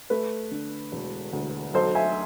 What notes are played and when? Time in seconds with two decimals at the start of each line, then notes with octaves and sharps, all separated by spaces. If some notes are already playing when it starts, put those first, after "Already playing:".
0.10 A3 B4
0.51 D3
0.92 E1
1.33 D2
1.74 B1 A4 C5
1.95 E5 G#5